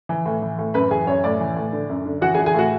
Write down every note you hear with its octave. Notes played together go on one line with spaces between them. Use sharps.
E3
A2
E3
A2
F#2 B4 B5
E3 G#4 G#5
F#2 C#5
A2 D5
E3
A2
D3
F#2
D3
E3 F#4 F#5
G#4 G#5
E3
G#4 G#5
A2 F#4 F#5